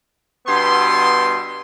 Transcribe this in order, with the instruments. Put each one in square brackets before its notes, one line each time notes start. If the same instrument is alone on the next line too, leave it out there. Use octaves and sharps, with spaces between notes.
[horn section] G2 B2 B3 C6